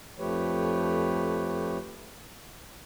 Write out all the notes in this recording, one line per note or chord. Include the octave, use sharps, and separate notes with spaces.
F2 F3 A3 G4 B4 C#5